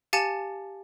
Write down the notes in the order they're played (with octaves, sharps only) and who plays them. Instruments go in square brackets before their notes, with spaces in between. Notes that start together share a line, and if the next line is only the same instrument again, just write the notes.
[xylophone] G4 F5 G#5 A5 A6 C#7